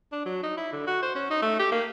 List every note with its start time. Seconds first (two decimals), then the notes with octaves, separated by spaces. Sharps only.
0.13 D4
0.26 F#3
0.43 D#4
0.57 E4
0.73 D3
0.87 F#4
1.02 C5
1.15 C#4
1.30 D#4
1.42 A3
1.59 G4
1.72 A#3